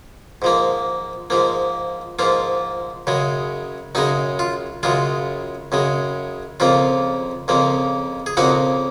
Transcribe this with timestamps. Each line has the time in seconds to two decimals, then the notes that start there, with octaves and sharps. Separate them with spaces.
0.42 G#2 F3 A#3
1.30 G#2 F3 A#3
2.19 G#2 F3 A#3 F4
3.07 F#2 C#3 G#3
3.95 F#2 C#3 G#3 D#4
4.39 F4
4.83 F#2 C#3 G#3 F4
5.72 F#2 C#3 G#3
6.60 F2 C#3 F3 A#3 F4
7.48 F2 C#3 F3 A#3
8.26 G#4
8.37 F2 C#3 F3 A#3 D#4 F#4